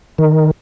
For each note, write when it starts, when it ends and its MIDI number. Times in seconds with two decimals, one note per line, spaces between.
0.18 0.51 51